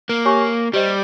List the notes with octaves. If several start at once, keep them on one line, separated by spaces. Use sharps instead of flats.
A#3
G4 C#5 G#5 C#6
G3 G4 C5 D#5